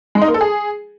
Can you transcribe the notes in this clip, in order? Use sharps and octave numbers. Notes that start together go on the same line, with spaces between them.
G#3
D#4
A#3
A4
G#4